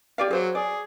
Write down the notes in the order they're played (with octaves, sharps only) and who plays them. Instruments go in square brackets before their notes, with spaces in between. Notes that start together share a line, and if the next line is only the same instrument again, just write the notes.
[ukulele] G4 D5 F5
[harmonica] F#3 [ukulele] G#4 C5
[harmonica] G#4 [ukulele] D5